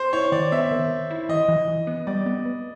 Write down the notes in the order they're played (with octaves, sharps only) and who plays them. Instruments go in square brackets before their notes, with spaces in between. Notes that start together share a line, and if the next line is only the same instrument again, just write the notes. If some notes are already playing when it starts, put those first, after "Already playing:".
Already playing: [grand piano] C5
[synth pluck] E4 [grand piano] C#5
[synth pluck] D#3 [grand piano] D5
[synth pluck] B3 [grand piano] E5
[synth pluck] D#3
D#3
E4
[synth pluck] E3 [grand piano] D#5
[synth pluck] E3
E3
B3
[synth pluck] G3 [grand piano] D5
[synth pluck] B3
B3